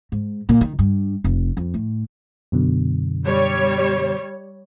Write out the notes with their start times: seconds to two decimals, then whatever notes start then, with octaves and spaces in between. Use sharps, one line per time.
0.12 G#2
0.49 A#2
0.61 D#3
0.79 G2
1.24 F1
1.57 F2
1.74 A2
2.52 F#2 B2 D3
3.26 G3 C#5